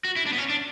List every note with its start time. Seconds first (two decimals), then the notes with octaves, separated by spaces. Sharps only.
0.05 F#4
0.16 E4
0.26 D4
0.33 B3
0.38 C#4
0.50 D4